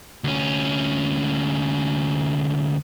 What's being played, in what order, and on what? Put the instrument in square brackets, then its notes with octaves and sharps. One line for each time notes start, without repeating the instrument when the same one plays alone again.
[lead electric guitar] D2 C#4